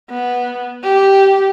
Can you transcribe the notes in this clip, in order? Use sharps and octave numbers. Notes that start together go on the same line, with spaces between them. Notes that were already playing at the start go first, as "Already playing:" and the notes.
B3
G4